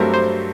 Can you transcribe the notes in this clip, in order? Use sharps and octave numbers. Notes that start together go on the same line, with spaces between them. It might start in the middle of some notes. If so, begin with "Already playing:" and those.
Already playing: G2 F#3 A3 C4 G4 A#4
C5